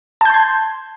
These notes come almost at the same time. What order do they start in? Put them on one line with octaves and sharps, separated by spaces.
A5 G6 C6 G#6